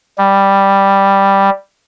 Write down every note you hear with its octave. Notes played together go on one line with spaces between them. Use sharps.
G3